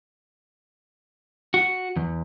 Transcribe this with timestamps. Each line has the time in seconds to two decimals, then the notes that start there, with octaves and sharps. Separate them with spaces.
1.54 F#4
1.96 E2